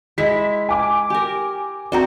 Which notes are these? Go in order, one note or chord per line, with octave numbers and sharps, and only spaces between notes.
G#3 E4 B6
G#5 D6
G4 A#4
C4 F#4 C5 D5 A#5